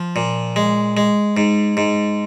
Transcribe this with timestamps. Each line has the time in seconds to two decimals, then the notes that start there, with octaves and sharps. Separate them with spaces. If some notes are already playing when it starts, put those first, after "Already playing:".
Already playing: F3
0.16 A#2
0.56 G#3
0.97 G#3
1.37 G#2
1.77 G#2